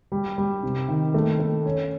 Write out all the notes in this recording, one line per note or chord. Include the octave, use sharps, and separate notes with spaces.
G3
G3
C3
D#3
A3
A3
C#4